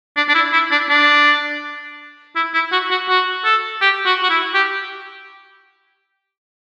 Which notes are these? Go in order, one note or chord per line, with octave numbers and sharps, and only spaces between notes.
D4
D4
E4
E4
D4
D4
E4
E4
F#4
F#4
F#4
A4
G4
F#4
F#4
E4
G4